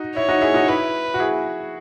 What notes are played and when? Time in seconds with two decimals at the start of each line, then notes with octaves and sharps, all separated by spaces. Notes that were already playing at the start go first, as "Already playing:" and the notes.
Already playing: D#4 F#4
0.15 E4 C#5
0.29 D#4 F#4
0.41 E4 G#4
0.54 D#4 F#4
0.68 E4 B4
1.14 F#4
1.19 E4 G#4